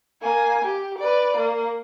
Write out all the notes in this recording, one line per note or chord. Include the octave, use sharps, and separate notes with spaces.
A#3 G#5
G4
B4 D5
A#3